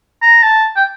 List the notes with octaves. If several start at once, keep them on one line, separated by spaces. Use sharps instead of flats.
A#5
A5
G5